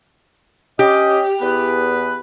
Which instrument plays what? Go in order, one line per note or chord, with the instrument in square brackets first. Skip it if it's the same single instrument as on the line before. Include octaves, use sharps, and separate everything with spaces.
[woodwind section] C#4 D#5 [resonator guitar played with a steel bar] G4
[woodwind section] E2 B3 B4